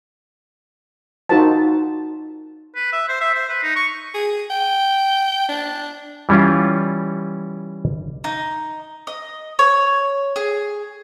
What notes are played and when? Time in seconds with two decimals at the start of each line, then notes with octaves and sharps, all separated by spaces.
1.29 D#4 F4 F#4 A#4 C5 A5
2.75 B4
2.93 E5
3.08 C5
3.21 E5
3.34 C5
3.49 B4
3.63 D#4
3.76 C#6
4.14 G#4
4.50 G5
5.49 D4
6.29 E3 G3 C#4 E4 F4
8.24 D#4
9.07 D#5
9.59 C#5
10.36 G#4